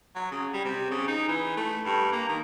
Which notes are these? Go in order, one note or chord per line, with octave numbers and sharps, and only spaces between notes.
F#3
C#3
G3
C3
C#3
D#4
E3
A3
G2
A#3
D#3